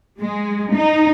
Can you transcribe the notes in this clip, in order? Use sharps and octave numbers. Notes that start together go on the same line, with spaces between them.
G#3
D#4